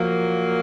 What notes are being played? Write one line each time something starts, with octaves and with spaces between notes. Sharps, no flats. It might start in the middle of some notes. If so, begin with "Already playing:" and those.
Already playing: A#2 F3 F#3 A#3